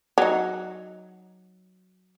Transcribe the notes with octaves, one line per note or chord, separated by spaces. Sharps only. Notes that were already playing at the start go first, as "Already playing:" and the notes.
F#3 D#4